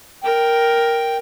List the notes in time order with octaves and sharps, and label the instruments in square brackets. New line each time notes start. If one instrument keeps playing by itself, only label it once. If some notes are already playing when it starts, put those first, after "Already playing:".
[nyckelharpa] A#4 [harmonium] G5